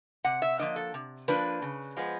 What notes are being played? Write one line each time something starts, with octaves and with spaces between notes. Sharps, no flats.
C3 F#5
E5
F3 A#3 D4 D#5
A4
C3
F3 A#3 D4 B4
C#3
F3 G#3 B3